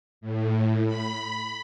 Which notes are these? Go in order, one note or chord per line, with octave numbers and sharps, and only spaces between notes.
A2
B5